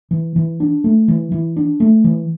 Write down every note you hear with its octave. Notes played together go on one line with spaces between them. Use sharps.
E3
E3
D4
A3
E3
E3
D4
A3
E3